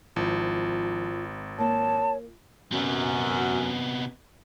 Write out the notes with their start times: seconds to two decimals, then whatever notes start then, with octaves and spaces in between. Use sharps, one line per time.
0.16 G#1 F3 E4 F4
1.58 A#3 F4 C#5 A5
2.72 F#2 C3 B3